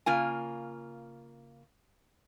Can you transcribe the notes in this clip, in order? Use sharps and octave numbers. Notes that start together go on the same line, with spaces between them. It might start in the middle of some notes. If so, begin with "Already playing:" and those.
C#3 A#3 F4 G#5